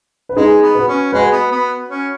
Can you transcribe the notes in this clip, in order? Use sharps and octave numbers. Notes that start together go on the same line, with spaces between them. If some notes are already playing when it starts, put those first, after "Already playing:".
B4
G#3 D#4 G#4
B3
F#4 B4
C#4
G#3 F#4 B4
B3
B3
C#4